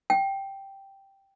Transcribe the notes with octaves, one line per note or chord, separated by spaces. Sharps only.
G5